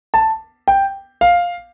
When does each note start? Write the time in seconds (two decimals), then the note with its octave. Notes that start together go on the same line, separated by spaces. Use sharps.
0.14 A5
0.68 G5
1.21 F5